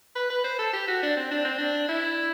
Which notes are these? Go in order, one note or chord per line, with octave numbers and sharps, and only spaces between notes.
B4
B4
C5
A4
G4
F#4
D4
C4
D4
C4
D4
E4